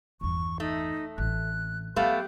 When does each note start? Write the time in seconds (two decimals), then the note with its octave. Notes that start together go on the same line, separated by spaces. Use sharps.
0.21 G1 E2 C#6
0.60 A3 D#4
1.18 A1 C4 F#6
1.96 F#3 A3 B3 G4 F5